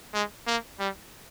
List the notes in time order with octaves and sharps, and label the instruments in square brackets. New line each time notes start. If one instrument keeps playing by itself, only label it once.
[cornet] G#3
A#3
G3